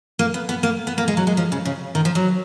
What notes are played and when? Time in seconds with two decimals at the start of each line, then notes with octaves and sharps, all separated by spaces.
0.19 A#3
0.34 B3
0.49 B3
0.63 A#3
0.87 B3
0.98 A#3
1.08 G#3
1.17 F#3
1.27 G#3
1.37 F3
1.52 C#3
1.65 C#3
1.95 D#3
2.05 F3
2.15 F#3